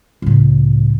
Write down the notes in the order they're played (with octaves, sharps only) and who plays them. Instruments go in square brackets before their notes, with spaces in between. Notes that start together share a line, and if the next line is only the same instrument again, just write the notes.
[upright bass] C#2 A2